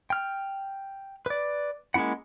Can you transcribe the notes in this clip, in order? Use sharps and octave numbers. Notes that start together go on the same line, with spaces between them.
G5 F6
B4 D5
G#3 A#3 C#4 E4 F#5